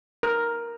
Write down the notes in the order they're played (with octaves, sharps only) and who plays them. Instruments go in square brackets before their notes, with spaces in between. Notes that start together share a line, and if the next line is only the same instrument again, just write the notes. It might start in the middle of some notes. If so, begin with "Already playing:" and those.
[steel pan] A#4